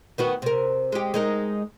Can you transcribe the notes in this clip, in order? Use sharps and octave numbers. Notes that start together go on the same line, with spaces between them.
D#3 B3 F#4
C3 A#4
G#3 G4
G#3 D#4 A#4